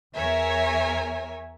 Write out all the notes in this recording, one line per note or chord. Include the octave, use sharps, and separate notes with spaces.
E2 A#4 C#5 E5 G#5